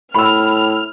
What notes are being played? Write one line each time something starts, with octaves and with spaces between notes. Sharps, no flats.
A2 B5 E6 F6